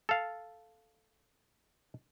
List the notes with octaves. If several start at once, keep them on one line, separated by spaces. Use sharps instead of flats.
A4 F5